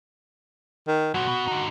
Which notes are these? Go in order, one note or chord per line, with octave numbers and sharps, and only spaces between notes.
D#3
A#2 F#3 F#4
B2
D3 D#4